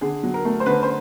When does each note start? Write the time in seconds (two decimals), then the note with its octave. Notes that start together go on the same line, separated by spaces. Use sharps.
0.01 D3 G#4
0.23 F#3
0.34 A#4
0.45 A3
0.60 C5
0.66 D3 B4
0.83 C5